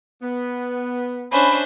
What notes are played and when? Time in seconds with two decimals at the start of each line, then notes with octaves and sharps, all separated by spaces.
0.22 B3
1.32 C#4 D4 C5 E5 B5